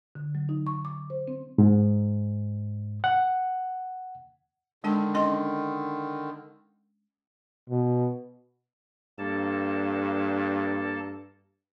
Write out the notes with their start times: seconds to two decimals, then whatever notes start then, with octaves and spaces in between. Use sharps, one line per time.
0.15 D3
0.35 F#3
0.49 D#4
0.67 C#6
0.85 D6
1.10 C5
1.28 C4
1.58 G#2
3.04 F#5
4.84 D3 D#3 G#3 D4 A5
5.14 C#4 D#5 C6
7.70 B2
9.19 G2 A#3 A4 A5